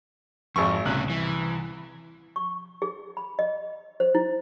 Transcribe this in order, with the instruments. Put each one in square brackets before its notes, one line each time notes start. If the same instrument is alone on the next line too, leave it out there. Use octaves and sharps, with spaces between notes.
[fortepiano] G#1 C#6 [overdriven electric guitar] F2
[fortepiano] C2 F#6 [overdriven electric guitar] A2 C#3
[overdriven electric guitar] E3
[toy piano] C#6
G#4
B5
D#5
C5
E4